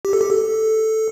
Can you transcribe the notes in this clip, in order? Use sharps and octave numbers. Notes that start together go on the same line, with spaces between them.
G4
A4
G4
A4